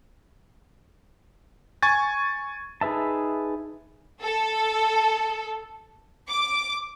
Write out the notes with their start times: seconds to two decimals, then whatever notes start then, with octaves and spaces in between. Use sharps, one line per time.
1.82 G#5 C#6 G#6 A6
2.81 D#4 G#4 B4 E5 A5
4.22 A4
6.29 D6